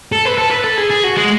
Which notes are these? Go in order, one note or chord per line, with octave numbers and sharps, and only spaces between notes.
A4
B4
A4
B4
A4
G#4
G#4
F#4
G#3